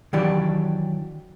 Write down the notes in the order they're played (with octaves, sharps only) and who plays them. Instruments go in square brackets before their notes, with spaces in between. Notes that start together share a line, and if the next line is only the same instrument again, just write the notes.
[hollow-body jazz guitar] D#3 E3 F#3 D4 G4 D5